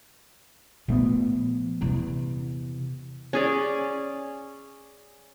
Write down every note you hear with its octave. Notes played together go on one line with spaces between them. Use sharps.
A#2 F3 A3 B3
E2 C3
C#4 G#4 D5